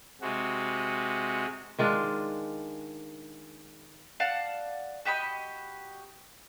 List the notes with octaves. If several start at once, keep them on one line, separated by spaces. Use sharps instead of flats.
C3 G#3 F#4
D#3 G#3 D4 F4
D5 F5 F#5 A5
F#4 G4 D#5 B5